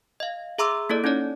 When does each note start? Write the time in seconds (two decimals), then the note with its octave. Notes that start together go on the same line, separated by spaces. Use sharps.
0.20 D#5 F5
0.58 G#4 E5 A#5 C6 D6 E6
0.90 A#3 E4 A4 D5
1.04 C#4 D#4 E4 C#5 D5